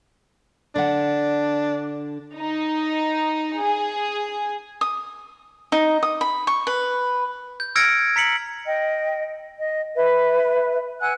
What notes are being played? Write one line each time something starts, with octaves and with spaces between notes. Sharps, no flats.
D3 D4 F#5
D#4
G#4
D#6
D#4
D#6
B5
C#6
B4
G6
E6 F6 G#6 A#6 C#7 D7
A#5 B6 C#7 F#7
D#5 G5
D#5
B4 E5
F#5 G#5 E6 F#6